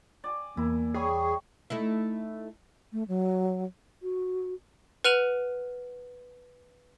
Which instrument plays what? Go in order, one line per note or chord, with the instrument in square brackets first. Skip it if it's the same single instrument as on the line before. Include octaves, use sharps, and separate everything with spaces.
[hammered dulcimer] D5 G#5
[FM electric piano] E2 [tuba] A#3 [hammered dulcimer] E4
[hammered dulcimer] G3 C#5 C#6 [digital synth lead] G#4
[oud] A3 D#4 E4
[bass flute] A3
F#3
F#4
[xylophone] B4 F#5 F6 D#7 F7 F#7